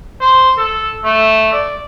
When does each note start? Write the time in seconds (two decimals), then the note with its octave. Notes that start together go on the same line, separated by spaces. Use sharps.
0.21 C5
0.58 A4
1.04 A3
1.52 D5